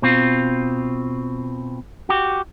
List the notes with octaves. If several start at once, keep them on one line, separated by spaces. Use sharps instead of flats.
B2 C4 F4
F#4 G4